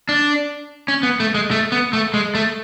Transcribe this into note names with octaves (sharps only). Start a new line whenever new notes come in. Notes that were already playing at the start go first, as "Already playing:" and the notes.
D4
C#4
B3
A3
G#3
A3
B3
A3
G#3
A3